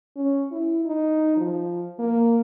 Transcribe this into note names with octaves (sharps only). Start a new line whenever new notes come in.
C#4
E4
D#4
F3
A#3